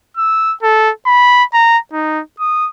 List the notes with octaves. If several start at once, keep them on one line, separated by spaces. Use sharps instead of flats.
E6
A4
B5
A#5
D#4
D#6